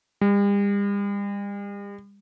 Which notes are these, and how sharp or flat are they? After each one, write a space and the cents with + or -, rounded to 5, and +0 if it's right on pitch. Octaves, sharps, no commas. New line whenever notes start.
G3 +45